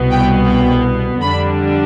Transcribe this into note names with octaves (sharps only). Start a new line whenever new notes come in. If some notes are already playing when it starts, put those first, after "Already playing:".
Already playing: C2 B2 B3
G5
G5
F2 D3 G3 D4 B5